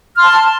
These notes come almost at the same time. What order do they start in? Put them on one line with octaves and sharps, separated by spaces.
F6 C6 A5